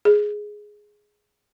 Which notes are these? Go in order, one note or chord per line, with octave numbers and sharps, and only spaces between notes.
G#4